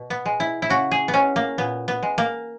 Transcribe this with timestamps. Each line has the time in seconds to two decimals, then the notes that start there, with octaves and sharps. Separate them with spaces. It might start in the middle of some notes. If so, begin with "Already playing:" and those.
Already playing: B2
0.10 B3
0.25 G#3
0.40 E4
0.62 E4
0.70 C#3 F#4
0.91 G#4
1.08 B3
1.13 G#3 C#4
1.36 A#3
1.58 A#2 B3
1.88 B3
2.03 G#3
2.18 A#3